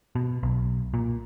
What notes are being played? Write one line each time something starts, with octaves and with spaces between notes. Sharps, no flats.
B2
B1
A#2